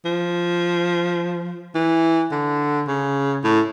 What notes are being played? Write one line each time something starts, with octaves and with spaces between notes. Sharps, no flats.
F3
E3
D3
C#3
A2